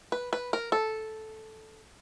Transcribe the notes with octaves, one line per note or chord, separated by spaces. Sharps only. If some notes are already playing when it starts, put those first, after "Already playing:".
B4
B4
A#4
A4